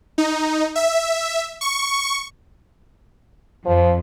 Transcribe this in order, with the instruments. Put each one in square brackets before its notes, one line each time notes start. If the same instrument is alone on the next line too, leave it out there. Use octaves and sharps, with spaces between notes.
[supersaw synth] D#4
E5
C#6
[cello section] F2 [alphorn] F3